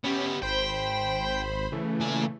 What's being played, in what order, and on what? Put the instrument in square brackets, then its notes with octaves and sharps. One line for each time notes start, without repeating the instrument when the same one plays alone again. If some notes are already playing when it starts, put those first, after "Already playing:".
[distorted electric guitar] B3 G4 [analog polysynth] C#4
[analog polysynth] G#1 C5 B5 [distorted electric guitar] G5
[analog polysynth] C#3 E3 A3
[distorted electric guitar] A#2 G#5